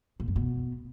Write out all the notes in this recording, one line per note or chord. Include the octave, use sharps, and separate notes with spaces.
A#2
F#2
B2